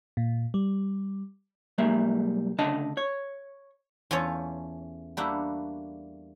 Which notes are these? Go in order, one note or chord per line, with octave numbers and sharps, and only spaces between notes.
A#2
G3
B1 G3 G#3 A#3 E5
D2 C#3 D4 D#5 A5
C#5
E2 E3 A3 C#4 F4 C#5
G3 A3 A#3 D4 E4 F#4